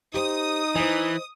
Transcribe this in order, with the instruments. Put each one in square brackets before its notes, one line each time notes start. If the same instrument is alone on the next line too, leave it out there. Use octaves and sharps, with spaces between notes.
[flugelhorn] D#4 [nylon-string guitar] G4 C5 [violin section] D#6
[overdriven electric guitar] E3 [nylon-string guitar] C5 D#5